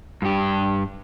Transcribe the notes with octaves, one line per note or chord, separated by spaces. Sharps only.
G2 G4